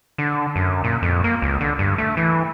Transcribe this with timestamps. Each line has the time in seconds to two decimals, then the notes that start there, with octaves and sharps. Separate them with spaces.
0.18 D3
0.56 F#2
0.84 A#2
1.02 F2
1.24 A#3
1.42 C#2
1.61 D3
1.79 G2
1.98 A3
2.17 E3